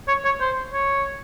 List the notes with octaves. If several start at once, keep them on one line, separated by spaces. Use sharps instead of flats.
C#5
C#5
C5
C#5